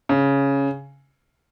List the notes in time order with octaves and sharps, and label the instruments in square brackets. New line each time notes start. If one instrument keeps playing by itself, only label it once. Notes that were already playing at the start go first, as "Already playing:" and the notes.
[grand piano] C#3